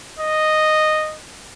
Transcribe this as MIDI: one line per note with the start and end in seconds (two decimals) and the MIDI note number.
0.19 1.17 75